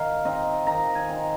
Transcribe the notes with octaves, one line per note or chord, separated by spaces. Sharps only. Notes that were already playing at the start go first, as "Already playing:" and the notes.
Already playing: D#3 F5
C4 D#4 D#5
D#3 A#5
G#5
C4 D#4